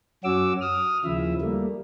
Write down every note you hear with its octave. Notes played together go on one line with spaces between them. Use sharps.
F#2 C#4 F#4 D6 E6
D#6 F6
D#2 C#3 F3 E4 E5
G3 A3 A#3